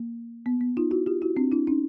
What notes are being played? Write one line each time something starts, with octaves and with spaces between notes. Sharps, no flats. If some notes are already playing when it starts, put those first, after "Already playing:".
Already playing: A#3
B3
B3
D#4 F4
E4 F#4
F4 G4
E4 F#4
C4 D4
D4 E4
C#4 D#4